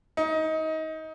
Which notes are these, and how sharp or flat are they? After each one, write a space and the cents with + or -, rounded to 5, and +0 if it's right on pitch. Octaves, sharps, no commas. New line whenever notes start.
D#4 +25